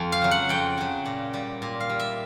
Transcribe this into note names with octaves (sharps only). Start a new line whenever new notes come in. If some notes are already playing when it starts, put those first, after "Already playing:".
Already playing: F2
F5
C#3 F#3
F#5
F2 G5
C#3 F#3
A#2
G3
A#2
F5
G3
E5